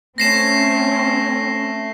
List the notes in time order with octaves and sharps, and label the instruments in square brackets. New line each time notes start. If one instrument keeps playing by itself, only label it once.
[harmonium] A3 [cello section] C4 C#4 [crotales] A#6 C7 E7